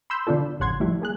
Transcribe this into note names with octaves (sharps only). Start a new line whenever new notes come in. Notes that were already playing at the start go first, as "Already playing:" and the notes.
B5 C6 E6 G6
D3 B3 D4 F4 A4
A1 F2 C#3 F#5 C6 G#6
F3 G3 A3 E4
A#3 G#4 F#6